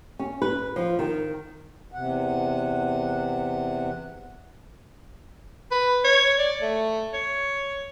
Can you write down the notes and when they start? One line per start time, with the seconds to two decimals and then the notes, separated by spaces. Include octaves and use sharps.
0.19 C#4
0.42 B4
0.76 F3
0.99 D#3
1.92 E2 C3 F#5
5.71 B4
6.04 C#5
6.38 D5
6.61 A3
7.13 C#5